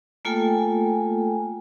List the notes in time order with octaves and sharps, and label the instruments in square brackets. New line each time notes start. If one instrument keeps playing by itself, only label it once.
[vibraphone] A3 A#3 F4 A4 G5 G#5